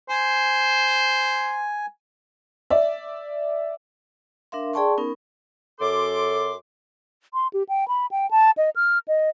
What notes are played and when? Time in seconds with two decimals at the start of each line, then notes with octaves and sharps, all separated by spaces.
0.10 C5 G#5
2.70 D5 E5
4.52 D4 A#4 E5 F5 C6
4.73 G#4 D5 G5 A5 C6 C#6
4.98 B3 C#4 D#4 A#4
5.80 F#2 A4 C6 D6
7.34 C6
7.53 G4
7.69 G5
7.88 B5
8.11 G5
8.31 A5
8.58 D#5
8.76 F6
9.08 D#5